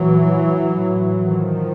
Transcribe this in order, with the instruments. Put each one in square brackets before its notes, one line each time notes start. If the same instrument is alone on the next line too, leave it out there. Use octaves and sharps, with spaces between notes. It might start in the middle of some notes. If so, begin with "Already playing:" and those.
Already playing: [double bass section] A#2 E3 F#3
A2
D#3 F3